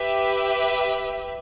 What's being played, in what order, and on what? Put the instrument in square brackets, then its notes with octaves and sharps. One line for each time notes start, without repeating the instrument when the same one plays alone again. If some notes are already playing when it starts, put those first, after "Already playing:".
Already playing: [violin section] G4 B4 E5